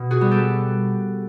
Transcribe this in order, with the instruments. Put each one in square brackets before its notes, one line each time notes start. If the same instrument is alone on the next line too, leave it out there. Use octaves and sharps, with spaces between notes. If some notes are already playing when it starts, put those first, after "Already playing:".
Already playing: [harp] B2
F#4 G#4
G3 B3
G4 A4